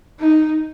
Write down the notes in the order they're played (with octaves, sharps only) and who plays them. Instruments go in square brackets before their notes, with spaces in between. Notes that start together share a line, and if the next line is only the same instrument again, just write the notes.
[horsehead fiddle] D#4